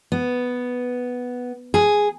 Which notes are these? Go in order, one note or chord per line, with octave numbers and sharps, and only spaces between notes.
B3
G#4